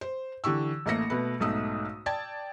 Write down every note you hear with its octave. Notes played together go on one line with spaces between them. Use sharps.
C5
D3 E3 G4 C#6 E6
A1 A3 A#3 E6 A#6 C#7
B2 A3 B4
B1 G#2 A3 D#4 D#6 E6
D5 G5 A5 G#6 A6